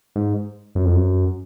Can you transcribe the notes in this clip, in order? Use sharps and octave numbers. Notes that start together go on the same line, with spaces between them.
G#2
F#2
F2
F#2